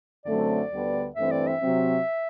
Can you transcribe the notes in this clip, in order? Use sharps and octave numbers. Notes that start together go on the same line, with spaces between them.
F#2 D3 F#3 A3 C4 D5
D2 D3 G3 B3
G2 E3 A3 C4 E5
D5
E5
C3 F#3 C4